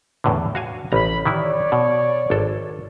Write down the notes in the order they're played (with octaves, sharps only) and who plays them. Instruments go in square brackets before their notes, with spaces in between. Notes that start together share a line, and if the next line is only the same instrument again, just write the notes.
[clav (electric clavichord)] E2 A2 D3
F#4 F5 G#5
[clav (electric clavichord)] A1 A#5 [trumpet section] B5
[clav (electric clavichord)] D#3 E3 E4 [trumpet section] C#5 D5
[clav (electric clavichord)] B2
G#1 A4